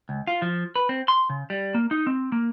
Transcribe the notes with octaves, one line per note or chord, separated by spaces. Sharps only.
C#2
F4
F3
B4
C4
C6
C#3
G3
A#3
D#4
C4
A#3